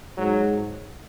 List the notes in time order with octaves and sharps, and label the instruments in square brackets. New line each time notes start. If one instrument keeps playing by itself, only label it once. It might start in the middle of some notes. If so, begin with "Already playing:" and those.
[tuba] G#2 [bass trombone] F#3